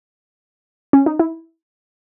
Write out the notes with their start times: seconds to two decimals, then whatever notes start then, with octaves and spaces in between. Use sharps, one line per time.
0.93 C#4
1.06 D#4
1.19 E4